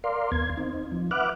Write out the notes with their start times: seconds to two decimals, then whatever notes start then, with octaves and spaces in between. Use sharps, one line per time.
0.04 A#4 D5 F5 C6
0.32 D#2 B3 G#6
0.57 C4 D#4
0.92 F3
1.11 B4 E5 F#5 D6 F6 F#6